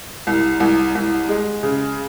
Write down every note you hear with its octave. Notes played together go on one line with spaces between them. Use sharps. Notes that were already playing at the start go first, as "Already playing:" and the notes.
C2
C2
C2
G#3
C#3